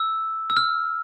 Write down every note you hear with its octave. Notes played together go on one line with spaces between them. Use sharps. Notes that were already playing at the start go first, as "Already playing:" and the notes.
Already playing: E6
E6
F6